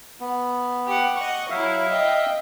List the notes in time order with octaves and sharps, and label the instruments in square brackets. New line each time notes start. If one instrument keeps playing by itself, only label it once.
[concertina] B3
[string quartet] G4 F#5
[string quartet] D#5 F#5 [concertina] C#6
[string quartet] F#3 E4 [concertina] E5 F5
[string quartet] D#5 G5